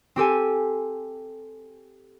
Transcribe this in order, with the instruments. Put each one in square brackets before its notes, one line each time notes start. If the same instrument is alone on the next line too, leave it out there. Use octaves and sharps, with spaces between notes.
[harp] C4 G4 A4 G#5